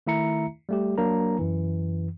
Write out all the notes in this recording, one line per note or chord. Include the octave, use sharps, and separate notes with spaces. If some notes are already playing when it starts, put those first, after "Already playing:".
D#3 A3 E4 E5 A#5 C#7
G3 A3 G4
F#3 A#3 D4 A#4 A#5
F#2 E3